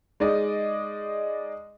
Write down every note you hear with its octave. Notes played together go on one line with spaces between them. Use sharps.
G#3 D#4 D5 D#5